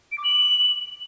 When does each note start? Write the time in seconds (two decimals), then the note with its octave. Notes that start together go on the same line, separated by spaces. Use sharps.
0.12 D7
0.18 D6
0.24 F#7